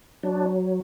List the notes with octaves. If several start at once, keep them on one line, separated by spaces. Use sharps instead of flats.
F#3 D4